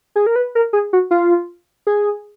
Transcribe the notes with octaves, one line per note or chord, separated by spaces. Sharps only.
G#4
A#4
B4
A#4
G#4
F#4
F4
G#4